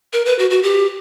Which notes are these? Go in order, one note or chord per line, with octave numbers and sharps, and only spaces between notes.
A#4
B4
F#4
F#4
G4